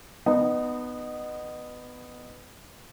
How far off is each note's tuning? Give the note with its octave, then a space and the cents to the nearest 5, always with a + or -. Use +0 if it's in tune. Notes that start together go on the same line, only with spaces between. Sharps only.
B3 +10 D#4 -25